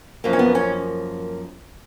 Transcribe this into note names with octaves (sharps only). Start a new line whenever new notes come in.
F#2 F3 A#3
C#4
B3
C#4